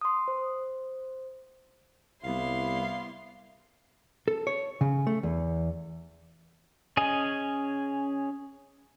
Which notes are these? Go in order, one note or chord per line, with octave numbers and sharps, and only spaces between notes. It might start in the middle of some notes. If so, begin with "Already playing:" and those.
C6 D#6
C5
C2 G3 B3 E4 F5 C6
A4
C#5
C#3
A3
E2
C#4 G#4 D#5 G#5